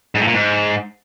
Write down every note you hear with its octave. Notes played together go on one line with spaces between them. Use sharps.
G#2
A2
A#2
G#2